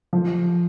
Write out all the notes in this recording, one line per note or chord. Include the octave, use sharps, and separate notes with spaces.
F3